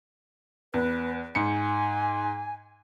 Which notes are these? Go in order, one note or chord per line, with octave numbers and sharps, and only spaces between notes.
E2 B4
G#2 G#5 C#7